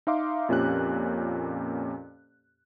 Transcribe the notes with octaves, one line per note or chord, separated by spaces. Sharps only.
D#4 E5 F5 C6 D6
F2 A#2 C#4 G4 F#6